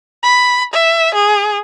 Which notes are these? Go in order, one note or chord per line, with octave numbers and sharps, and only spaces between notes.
B5
E5
G#4